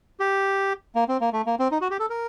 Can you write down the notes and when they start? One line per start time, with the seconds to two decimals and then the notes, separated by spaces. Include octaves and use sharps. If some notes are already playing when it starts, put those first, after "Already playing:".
0.20 G4
0.95 A#3
1.09 C4
1.21 A#3
1.33 A3
1.46 A#3
1.59 C4
1.71 D#4
1.81 F#4
1.91 G4
1.99 A4
2.10 A#4